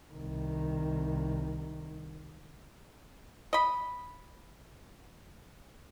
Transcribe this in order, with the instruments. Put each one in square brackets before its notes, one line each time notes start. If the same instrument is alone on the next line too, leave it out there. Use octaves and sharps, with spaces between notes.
[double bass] C2 D#3
[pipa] D#5 B5